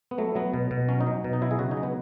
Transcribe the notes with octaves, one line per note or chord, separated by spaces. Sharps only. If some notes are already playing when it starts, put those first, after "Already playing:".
B3
F#3 A3
F#3 B3
B2
B2
F#3 C#4
D#4
F#3
B2
D#4
F#3 E4
G#4
C#3 F#4
D#4
F#3
B3